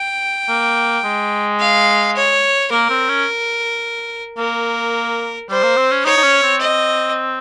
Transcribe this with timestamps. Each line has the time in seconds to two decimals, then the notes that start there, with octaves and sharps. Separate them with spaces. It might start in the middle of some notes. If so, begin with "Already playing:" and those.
Already playing: G5
0.49 A#3
1.04 G#3
1.59 F5
2.16 C#5
2.71 A#3 A#4
2.90 C4
3.09 C#4
4.38 A#3 A#4
5.49 G3 C5
5.63 A#3
5.77 C4
5.91 C#4
6.05 D#4 C#5
6.17 D#4
6.23 C#4
6.43 C4
6.60 D#5